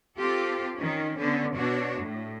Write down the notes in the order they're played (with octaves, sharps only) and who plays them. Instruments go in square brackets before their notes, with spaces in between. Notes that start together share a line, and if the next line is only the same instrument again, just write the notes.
[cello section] C4 F4 G4 A4
D#3 C#4
D3 B3 C#4
B2 D4 F#4 C#5
A2